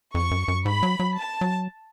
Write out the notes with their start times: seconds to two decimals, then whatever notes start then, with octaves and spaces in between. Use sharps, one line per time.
0.15 F2 C#6
0.31 F#2
0.48 F#2
0.65 G#2 B5
0.83 F#3
1.00 F#3
1.15 A5
1.41 F#3